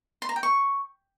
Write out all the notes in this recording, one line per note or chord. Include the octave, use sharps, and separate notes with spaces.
C6
A#5
G5
C#6